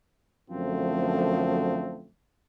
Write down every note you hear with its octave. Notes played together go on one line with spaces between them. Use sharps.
F#2 D3 F3 A3 C4